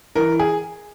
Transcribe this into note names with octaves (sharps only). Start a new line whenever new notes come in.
E3 A#4
G#4